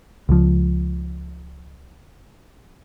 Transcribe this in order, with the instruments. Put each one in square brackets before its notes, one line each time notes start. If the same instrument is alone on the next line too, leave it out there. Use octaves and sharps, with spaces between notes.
[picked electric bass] C#2 F3